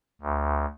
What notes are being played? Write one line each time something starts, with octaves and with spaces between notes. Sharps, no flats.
D2